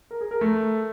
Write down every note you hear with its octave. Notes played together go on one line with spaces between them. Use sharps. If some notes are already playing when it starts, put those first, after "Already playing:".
A#4
G#4
A#4
A3